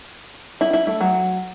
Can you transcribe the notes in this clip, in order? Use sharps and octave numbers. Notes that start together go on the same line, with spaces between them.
E4
E4
A3
F#3